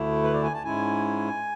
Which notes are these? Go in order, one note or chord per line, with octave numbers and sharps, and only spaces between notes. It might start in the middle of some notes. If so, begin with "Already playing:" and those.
Already playing: D2 D3 A3 E4
B4
D5
G#5
A5
G#2 G#3 C#4 E4 G#5